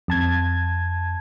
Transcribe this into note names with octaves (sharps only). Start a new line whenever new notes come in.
F2 A5 G#6